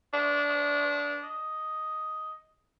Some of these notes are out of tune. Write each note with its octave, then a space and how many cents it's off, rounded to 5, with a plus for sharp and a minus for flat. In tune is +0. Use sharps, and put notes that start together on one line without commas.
D4 -20
D#5 +5